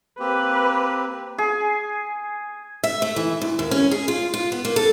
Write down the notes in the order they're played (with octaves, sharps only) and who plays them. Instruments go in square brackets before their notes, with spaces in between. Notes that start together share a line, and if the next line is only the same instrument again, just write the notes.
[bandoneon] A#3 C4 G4 [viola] B4
[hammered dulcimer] G#4
[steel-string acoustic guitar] E5
A3
E3
D2
D#2
C#4
G#4
F4
F4
B3
A#3
A4